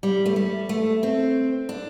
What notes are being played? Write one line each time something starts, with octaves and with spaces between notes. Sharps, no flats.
G3
A3
G3
A3
C4
D4